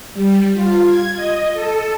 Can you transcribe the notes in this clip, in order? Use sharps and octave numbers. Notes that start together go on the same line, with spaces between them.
G3
F4
G#6
D#5
A4